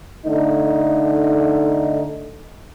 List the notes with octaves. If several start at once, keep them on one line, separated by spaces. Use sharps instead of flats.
D3 A3 D#4